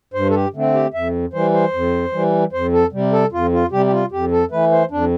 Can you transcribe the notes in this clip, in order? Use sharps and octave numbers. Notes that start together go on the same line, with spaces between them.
G2 C5
A4
G4
D3 A3 C4
G4
F2 E5
E3 G3 C5
C5
F2
E3 G3
F2 C5
A4
C3 G3
A4
F2 F4
F4
C3 G3 G4
G4
F4
F2 G4
A4
E3 A3 B4
C5
F2 D4